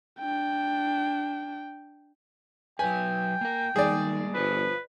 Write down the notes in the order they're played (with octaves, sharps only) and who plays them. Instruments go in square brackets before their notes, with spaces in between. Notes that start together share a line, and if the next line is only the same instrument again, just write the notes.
[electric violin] D4 G5
[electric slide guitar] F#3 B4 [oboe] G5 [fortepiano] G#5
[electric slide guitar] A#3 A#4
[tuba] D#3 [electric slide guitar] G3 G#3 A#3 [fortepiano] G#4 D5
[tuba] G1 [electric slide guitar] F4 C5 [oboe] B4